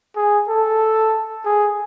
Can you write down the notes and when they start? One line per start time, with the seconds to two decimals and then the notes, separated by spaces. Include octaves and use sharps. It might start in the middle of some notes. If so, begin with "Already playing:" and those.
0.16 G#4
0.49 A4
1.45 G#4